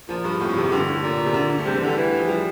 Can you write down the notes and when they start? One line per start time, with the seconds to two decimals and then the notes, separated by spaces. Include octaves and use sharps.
0.08 A#2 F3
0.25 G2
0.40 F2 A2
0.56 F2 C3
0.67 F2
0.72 G2 D3
0.88 A2
1.02 A#2
1.25 C3
1.34 D3
1.50 D3
1.59 A3
1.65 C3 G3
1.75 E3
1.82 D3 G3
1.97 E3
2.17 F3
2.28 G3